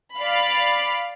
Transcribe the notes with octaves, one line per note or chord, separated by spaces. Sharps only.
D5 F5 B5